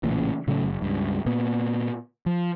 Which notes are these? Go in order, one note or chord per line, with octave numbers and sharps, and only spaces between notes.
A1 A#2 C#3 E3
A2 C#3 F#3 A3
F#1
C#2 G2
A#2 A#3 B3
F3